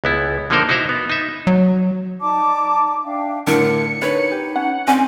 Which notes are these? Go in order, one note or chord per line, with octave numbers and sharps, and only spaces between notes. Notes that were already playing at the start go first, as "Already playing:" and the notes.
C#2 B3 E4
D3 F3 A#3 D#4 A#4 C5
D#4 E4 F#4 C5 E5 F5
B3
D#4 E5
F#3
D#4 D5 A5 D6
D4 E5 F5 G5
A2 D3 A#4 C#7
D4 D#4 B4 C#5
G4
C#4 F#5
C4 C#4 G#5